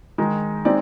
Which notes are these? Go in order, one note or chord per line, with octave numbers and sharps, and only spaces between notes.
D#3 G#3 D#4
G#3 C4 D#4 D5